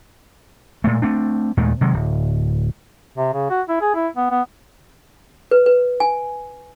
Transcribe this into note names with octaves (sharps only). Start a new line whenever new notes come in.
A#2 G#3 A3
A3 C4 D4
D#2 A#2 G#3 A3
C3 D#3 F#3 G#3
D1
C3
C#3
F#4
E4
G#4
E4
B3
B3
B4
B4
G#5